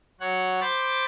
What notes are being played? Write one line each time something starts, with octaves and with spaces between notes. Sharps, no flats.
F#3 C#5 F#5
C5 B5 D6 A6